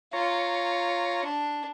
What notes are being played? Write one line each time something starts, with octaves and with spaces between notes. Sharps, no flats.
F4 C#5 A#5
D4